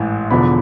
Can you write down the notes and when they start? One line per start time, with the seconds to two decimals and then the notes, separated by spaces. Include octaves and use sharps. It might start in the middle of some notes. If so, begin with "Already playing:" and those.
Already playing: A1 G#2 E3
0.30 E1 E2 D3 F3 B5